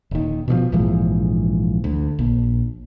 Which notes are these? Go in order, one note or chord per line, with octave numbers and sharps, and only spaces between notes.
D#1 D#3
B2 D#3 F3
A#1 G#2 E3 F3
D2
A#1